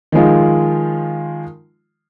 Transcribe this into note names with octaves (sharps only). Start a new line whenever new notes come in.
D#3 F3 G#3 F4